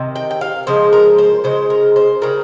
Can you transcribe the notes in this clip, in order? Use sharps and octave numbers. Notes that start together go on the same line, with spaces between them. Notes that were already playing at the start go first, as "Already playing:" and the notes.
Already playing: C3 D#3
G5
G5
F5
C#3 F3 G#3 C5
A#4
C5
C#3 G#3 C5
A#4
C5
C#3 G3 A#4